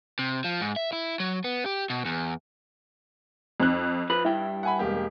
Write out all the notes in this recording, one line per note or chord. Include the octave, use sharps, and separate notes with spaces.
C3
F3
G#2
E5
E4
F#3
B3
G4
B2
E2
F2 F#6
F3 B4
G2 E4 G5
F#5 G#5 B5
E1 A#3 G4